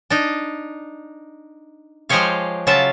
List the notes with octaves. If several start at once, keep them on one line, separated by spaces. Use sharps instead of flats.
D4 D#4
F3 G#3 G4 G#4 C#5 F5
C#3 F#3 F4 E5 A5